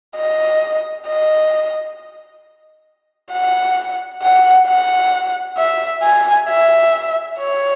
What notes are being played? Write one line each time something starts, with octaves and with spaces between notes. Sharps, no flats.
D#5
D#5
F#5
F#5
F#5
E5
G#5
E5
C#5